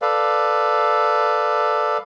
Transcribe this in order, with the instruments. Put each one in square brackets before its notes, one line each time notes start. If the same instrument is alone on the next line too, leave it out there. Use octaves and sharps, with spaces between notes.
[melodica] A4 B4 D5 F5